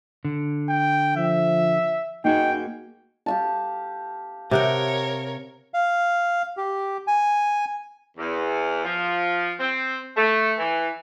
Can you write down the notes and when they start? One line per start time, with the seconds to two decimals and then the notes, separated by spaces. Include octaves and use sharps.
0.25 D3
0.69 G5
1.17 F3 E5
2.25 A#3 D#4 F#4 G#4 G5
3.26 G4 F5 A5
4.51 C3 A#4 C#5 F#5 G5
5.74 F5
6.57 G4
7.07 G#5
8.18 E2
8.84 F3
9.59 C4
10.17 A3
10.58 E3